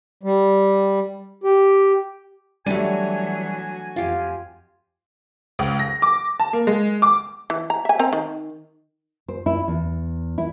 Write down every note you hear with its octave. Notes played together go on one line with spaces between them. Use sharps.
G3
G4
E3 F#3 G3 A3 D4 F#4 G#5 D#7
F2 F4 G4 F5
C#2
A#6
D6
A5
A#3
G#3
D6
E3
A#5
E5 G#5
C4 A#4 A#5
D#3
C5
E4
E2
E4